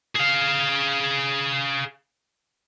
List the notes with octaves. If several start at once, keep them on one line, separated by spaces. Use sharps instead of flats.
G#4 F5